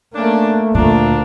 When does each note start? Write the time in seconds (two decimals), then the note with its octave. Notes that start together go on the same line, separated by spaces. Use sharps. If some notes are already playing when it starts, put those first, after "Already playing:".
0.14 A3 A#3 C#4 D4
0.75 D2 A#2 A#3 D4